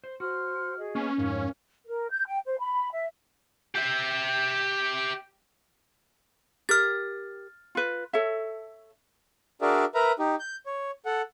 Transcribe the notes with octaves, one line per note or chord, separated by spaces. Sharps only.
C5
F#4 C5 C6 F6
G#4 D#5
A#3 B3 C#4 B4
F2 G#2 D#4 A#4 F5
A#4
G6
G5
C5
B5
E5
G4 E5
G4 A#4 F6 A6
F4 B4
A4 C#5 E5
D4 F#4 G#4 A#4 D5 E5
A#4 B4 E5 A#5
D#4 G4
G6
C#5
A4 F#5